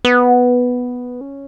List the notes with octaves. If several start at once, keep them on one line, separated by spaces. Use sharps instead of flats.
B3
C#4